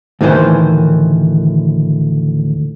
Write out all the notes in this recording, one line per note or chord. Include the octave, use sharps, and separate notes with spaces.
D2 A2 D#3 E3 C5